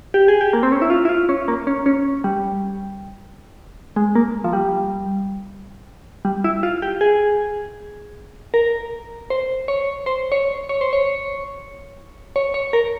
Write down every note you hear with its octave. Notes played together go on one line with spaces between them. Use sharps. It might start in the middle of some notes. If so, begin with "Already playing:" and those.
G4
G#4
G4
A#3
C4
C#4
E4
F4
E4
F4
C#4
A#3
C#4
C#4
G3
G#3
A#3
F3
G3
G3
E4
F4
G4
G#4
A#4
C5
C#5
C5
C#5
C#5
C5
C#5
C#5
C#5
A#4